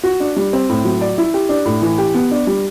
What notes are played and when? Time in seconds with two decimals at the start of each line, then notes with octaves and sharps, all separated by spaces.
0.03 F#4
0.20 D4
0.36 G3
0.53 C4
0.69 A2
0.85 F#3
1.01 D5
1.18 E4
1.34 G4
1.49 D4
1.65 A2
1.82 E3
1.98 G4
2.14 B3
2.31 D4
2.47 G3